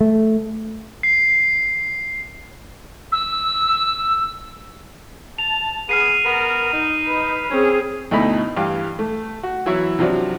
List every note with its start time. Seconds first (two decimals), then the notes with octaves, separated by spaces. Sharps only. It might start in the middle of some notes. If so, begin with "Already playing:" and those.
0.01 A3
1.03 C7
3.12 E6
5.38 A5 F7
5.89 B3 G#4 F6 C7 D#7
6.25 B3 A#4
6.74 D#4
7.08 B4
7.51 C4 C#4 G#4
8.11 D2 B2 A3 D#4 E4 B5
8.57 G2 E3 G4 F5
8.99 A3
9.43 F#4
9.66 E3 F#3 E4 C#5 E5
9.99 C3 F3 F#3 D4